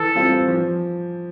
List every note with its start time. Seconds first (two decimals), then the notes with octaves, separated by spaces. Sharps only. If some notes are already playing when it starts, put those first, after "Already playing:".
Already playing: E3 A4
0.16 G3 C4 F4
0.48 F3